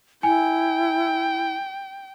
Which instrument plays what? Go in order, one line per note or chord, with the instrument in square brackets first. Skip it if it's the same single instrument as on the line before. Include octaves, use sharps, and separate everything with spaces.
[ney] E4 [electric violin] G5 [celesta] G#5